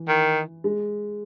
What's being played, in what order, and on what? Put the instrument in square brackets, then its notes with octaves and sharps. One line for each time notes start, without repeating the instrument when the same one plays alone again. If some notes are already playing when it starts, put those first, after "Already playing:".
Already playing: [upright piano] E3
[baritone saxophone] D#3
[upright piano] G#3